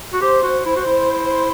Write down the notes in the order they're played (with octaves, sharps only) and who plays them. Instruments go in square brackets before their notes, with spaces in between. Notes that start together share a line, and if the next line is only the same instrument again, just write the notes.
[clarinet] F#4
[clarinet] G4 [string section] C5
[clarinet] F#4
[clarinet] E4 [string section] C5
[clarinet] F#4
E4